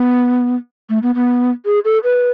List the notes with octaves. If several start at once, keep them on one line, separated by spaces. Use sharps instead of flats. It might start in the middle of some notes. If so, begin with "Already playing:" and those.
Already playing: B3
A3
B3
B3
G#4
A4
B4